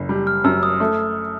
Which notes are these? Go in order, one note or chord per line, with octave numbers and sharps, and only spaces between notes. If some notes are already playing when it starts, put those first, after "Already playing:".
Already playing: F#1
G3
F6
F#2 E6
D#6
A3